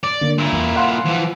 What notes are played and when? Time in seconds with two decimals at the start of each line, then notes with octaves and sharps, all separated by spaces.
0.03 D5
0.21 D3 A#3
0.38 A#2 E4
0.53 E2
0.76 F5 F#5 C6
1.05 E3 F3